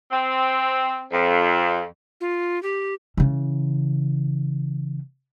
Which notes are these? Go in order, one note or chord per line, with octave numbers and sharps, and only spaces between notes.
C4
F2
F4
G4
C#3 E3